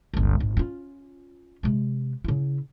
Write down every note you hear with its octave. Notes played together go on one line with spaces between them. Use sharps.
G1 C#2
G#1
C#4 F4
C3 G#3
C#3 E4